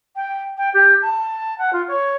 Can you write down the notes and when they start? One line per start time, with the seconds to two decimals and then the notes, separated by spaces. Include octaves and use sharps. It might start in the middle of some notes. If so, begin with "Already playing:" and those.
0.16 G5
0.58 G5
0.74 G4
1.02 A5
1.58 F#5
1.73 F4
1.88 C#5